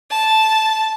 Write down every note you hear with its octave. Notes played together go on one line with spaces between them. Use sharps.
A5